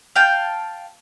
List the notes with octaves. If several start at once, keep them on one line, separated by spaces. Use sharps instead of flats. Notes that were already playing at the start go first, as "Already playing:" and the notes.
F5 G5 A5